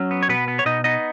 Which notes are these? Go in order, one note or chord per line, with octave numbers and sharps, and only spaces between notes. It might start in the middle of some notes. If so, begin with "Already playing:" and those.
Already playing: F#3 C#4
B3
C#5
B2 B3 B4
B3
C#5
B2 D#4 D#5
B3 D#4 D#5